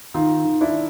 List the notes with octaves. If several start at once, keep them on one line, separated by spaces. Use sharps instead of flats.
D#3 D#4 F4
D#3
D4 E4